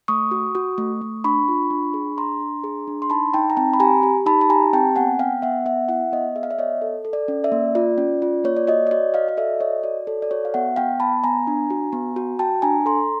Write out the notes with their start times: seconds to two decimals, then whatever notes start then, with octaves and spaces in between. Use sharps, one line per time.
0.08 A3 C#6 D#6
0.31 F#4
0.55 F#4
0.78 A3
1.01 A3
1.24 D4 B5 C#6
1.48 F4
1.70 D4
1.94 G#4
2.17 D4 A#5 C6
2.41 D4
2.64 G#4
2.88 D4
3.02 C6
3.10 D#4 A5 B5
3.34 D#4 G5 A5
3.50 A#5
3.57 C4 G5 A5
3.73 B5
3.80 G4 G#5 A#5
4.03 G4
4.26 D#4 A5 B5
4.41 A5
4.49 G4 G#5 A#5
4.73 C4 G5 A5
4.96 B3 F#5 G#5
5.19 B3 F5 G5
5.42 B3 E5 F#5
5.66 B3 E5 F#5
5.89 E4 E5 F#5
6.12 B3 D#5 F5
6.36 G#4 E5
6.43 F5
6.50 D5 E5
6.58 B3 C#5 D#5
6.82 A4
7.05 A4
7.13 D5
7.28 C#4
7.44 D5 E5
7.52 A#3
7.75 F4 D5
7.98 C#4
8.22 F4
8.44 A#3 C#5
8.56 D5
8.67 F#4 C#5 D#5
8.87 D5
8.91 F#4 C#5 D#5
9.14 F#4 D#5 F5
9.28 D#5
9.37 A4 D5 E5
9.60 F#4 C#5 D#5
9.83 F#4 D5
10.07 A4 C#5
10.22 D5
10.31 F#4 C#5
10.45 F5
10.54 B3 E5 F#5
10.76 B3 F5 G5
11.00 B3 A5 B5
11.23 B3 G#5 A#5
11.47 D4
11.70 F#4
11.93 B3
12.16 F#4
12.39 F#4 G5 A5
12.62 D4 G#5 A#5
12.85 A4 A#5 C6